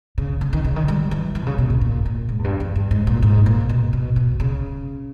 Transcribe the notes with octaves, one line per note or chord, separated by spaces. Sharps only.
C#3
C#3
D#3
C#3
D#3
G3
E3
E3
B2
C#3
B2
A#2
A#2
A#2
G#2
E2
G2
E2
G2
G#2
A#2
G#2
A#2
B2
B2
B2
C#3